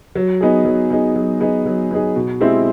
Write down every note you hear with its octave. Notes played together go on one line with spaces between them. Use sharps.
F#3
B3 D#4 G#4
F#3
B3 D#4 G#4
F#3
B3 D#4 G#4
F#3
B3 D#4 G#4
B2
G#3 C4 E4 G4